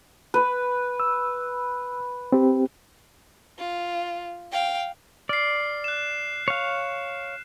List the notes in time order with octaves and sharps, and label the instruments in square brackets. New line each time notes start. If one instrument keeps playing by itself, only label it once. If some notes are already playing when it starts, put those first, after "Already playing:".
[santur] B4
[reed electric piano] E6
C4 G4
[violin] F4
F5 G5
[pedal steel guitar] D5 [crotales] F6 C7
[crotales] F#6 E7
[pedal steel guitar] C#5 F5